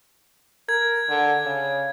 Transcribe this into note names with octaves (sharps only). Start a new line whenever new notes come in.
A#4 G#6
D3
C#3